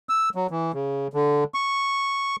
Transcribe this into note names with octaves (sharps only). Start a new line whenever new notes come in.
E6
F#3
E3
C#3
D3
C#6